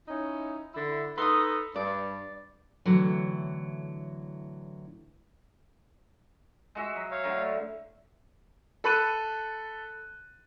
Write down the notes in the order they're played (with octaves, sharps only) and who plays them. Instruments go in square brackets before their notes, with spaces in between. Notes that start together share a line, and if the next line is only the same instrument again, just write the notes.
[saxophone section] C#4 D#4 E4
D3 E4
[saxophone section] D#4 A4 B4 [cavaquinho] C6 D#6
[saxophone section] G2 [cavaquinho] D5
[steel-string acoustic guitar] A2 D3 E3 F#3
[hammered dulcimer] G#3 F#4 E5
F#3
[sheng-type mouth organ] C#5 F5
[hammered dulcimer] A2 D3 F#3
[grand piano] A4 B5 F#6 D#7